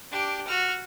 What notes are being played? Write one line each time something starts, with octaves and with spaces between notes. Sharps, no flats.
D4 G4
F#4 F6